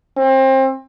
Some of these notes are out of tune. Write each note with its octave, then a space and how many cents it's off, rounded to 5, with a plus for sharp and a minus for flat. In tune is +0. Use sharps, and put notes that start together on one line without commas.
C4 +30